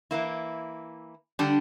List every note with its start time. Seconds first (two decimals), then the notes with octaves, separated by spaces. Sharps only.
0.11 E3 A#3 E4
1.39 D3 G3 D4